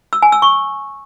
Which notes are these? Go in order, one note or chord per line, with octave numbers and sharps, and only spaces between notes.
E6
G#5
E6
C#6